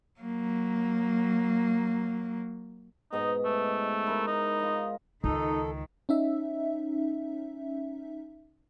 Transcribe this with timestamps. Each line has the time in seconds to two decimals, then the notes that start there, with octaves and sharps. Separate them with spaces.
0.20 F#3 A#3
3.13 G#2 B2 D#4 D#5
3.45 A3
4.07 E4 A#4
4.27 D#4
4.59 F4 D#5
5.24 C#2 D#3 D#4 A4
6.09 C#4 D#4 E5